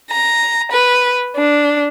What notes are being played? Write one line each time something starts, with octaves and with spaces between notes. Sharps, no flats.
A#5
B4
D4